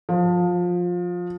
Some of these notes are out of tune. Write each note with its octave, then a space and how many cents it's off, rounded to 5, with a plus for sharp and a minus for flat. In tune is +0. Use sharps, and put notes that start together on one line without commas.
F3 +20